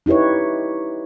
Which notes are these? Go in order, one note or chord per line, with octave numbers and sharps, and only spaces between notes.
D#4 E4 G4 B4 C#5